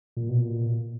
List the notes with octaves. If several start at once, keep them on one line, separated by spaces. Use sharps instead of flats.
A#2
B2
A#2